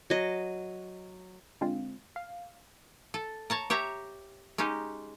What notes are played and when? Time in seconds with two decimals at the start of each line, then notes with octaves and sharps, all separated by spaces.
0.10 F#3 D#5
1.61 D3 G#3 C4 F4
2.16 F5
3.14 A4
3.50 C#5 A5 A#5
3.70 G4 C#5 E5 A#5
4.58 G#3 C#4 D#4 G4